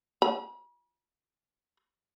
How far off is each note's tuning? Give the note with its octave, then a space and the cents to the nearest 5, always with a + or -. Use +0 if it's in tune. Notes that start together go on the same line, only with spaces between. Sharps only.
B5 -40